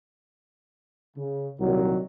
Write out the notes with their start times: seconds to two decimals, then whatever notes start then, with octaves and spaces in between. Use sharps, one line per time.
1.17 C#3
1.60 C2 A#2 D#3 F#3